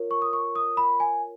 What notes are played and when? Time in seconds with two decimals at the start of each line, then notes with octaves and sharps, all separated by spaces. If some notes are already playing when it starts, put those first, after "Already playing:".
Already playing: F4 A#4 C#5
0.11 C#6
0.22 D#6
0.33 C#6
0.55 D#6
0.77 B5
1.00 G#5